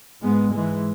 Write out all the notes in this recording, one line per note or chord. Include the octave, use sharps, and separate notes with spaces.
G#2 G#3 B3
G#2 E3 G#3